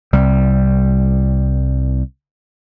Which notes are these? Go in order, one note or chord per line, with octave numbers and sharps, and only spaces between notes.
C2 G3